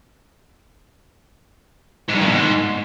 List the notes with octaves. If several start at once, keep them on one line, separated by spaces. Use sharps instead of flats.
G#2
G2
D#3
B2
G#2